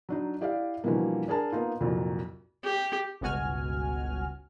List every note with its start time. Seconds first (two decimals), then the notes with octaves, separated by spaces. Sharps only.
0.09 F#3 D4 D#4
0.41 E4 G4 D5 D#5 F5
0.84 B2 D3 E3 F3 G3 A#3
1.28 D4 G#4 A#4 A5
1.52 A#3 B3 D#4 F4
1.80 C2 F2 A#2 F#3
2.64 G4
3.21 G1 C#2 B2 F#4 G#5 F6